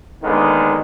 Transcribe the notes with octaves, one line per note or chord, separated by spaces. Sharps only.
D#2 D3 D#3 G#3 B3